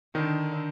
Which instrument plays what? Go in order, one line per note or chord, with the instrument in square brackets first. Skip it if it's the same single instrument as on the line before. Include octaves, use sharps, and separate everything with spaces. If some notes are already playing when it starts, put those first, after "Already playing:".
[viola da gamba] D3 [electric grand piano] D#3 D#4